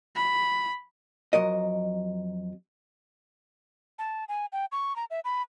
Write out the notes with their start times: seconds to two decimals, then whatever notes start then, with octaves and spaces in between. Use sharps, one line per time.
0.15 B5
1.33 F2 F#3 A#4 D#5
3.99 A5
4.28 G#5
4.52 G5
4.72 C#6
4.96 A#5
5.10 E5
5.24 B5